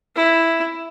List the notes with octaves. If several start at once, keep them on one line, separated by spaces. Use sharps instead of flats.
E4